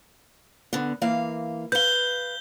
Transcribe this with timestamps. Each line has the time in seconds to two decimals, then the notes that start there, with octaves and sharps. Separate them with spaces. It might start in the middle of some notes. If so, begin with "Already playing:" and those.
0.73 D3 B3
1.02 E3 A#3 F5
1.72 B4 F5 G6 G7